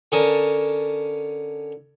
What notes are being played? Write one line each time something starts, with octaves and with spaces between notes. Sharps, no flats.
D3 C#4 A#4 A5 D#6